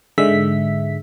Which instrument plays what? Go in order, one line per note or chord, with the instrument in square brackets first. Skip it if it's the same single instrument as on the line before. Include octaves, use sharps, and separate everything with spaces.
[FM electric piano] G#2 D3 G#3 E5 B6